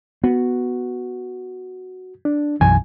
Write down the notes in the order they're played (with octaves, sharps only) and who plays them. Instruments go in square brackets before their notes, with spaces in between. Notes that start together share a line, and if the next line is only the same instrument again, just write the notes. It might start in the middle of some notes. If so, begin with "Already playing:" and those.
[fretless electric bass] B3 [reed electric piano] F#4
[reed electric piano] D4
[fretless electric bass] B1 F#2 E3 [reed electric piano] G#5